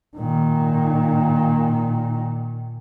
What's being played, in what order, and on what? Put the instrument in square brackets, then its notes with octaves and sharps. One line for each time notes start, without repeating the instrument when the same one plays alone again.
[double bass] A#2 D#3